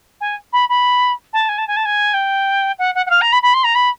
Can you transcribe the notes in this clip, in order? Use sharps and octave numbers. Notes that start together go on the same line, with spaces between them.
G#5
B5
B5
A5
G#5
A5
G#5
A5
G#5
G5
F#5
F#5
F#5
F5
A#5
B5
B5
C6
A#5
B5